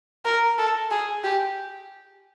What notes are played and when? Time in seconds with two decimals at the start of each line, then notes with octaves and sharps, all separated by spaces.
0.25 A#4
0.58 A4
0.91 G#4
1.24 G4